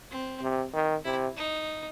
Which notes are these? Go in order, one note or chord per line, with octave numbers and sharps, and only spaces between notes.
C4
C3
D#3
C3 E4
D#4